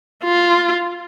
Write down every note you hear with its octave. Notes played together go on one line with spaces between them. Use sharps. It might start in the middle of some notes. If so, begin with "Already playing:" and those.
F4